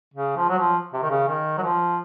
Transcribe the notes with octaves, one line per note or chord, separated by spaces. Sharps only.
C#3
F3
F#3
F3
C3
D#3
C#3
D#3
F#3
F3